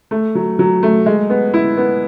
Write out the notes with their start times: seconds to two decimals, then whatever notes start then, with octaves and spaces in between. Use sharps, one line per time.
0.11 A3
0.35 F#3
0.59 F#3
0.83 A3
1.06 G#3
1.30 B3
1.54 E4
1.77 B3